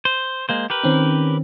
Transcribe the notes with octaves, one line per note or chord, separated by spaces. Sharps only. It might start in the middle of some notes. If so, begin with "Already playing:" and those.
C5
G#3 A#3 C5
G4 A#4 B4
D#3 C4 C#4